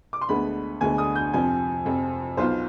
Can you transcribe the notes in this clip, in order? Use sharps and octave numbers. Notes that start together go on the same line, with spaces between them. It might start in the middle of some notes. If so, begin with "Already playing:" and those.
D6
C6
D2 D3 G#3 B3 B5
D2 D3 G#3 B3 G#5
D#6
G6
F2 C3 F3 C4 G#5
F2 C3 F3 C4
B1 B2 B3 F4 C5